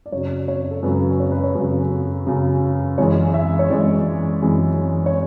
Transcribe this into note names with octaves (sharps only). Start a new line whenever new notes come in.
D5
F#2 C#3 F#3 C#5
C#5
A4
F#2 C#3 F#3 B4
C#5
B4
C#5
F#2 C#3 F#3
F#2 C#3 F#3
F#2 E3 G#3 C#5
E5
C#5
F#2 E3 G#3 D5
F#2 E3 G#3
C#5